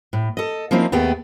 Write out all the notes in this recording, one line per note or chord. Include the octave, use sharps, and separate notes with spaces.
A2
A4 D#5
F3 A#3 C4 C#4 D#4 E4
D#2 A3 B3 G#4 G5